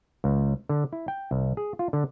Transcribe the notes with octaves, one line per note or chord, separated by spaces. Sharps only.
C#2
D3
E4
G5
C2
G#4
F4
D3